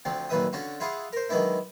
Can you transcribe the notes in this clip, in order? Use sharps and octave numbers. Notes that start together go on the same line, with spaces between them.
D2 D3 F3 C4
F#2 A#2 D#3 B4 E5 D#6
D3 C#4 F4 F#4
E4 F4 G#4 F5 F#5
A#4 C5
D#3 F#3 G#3 B3 D4 E4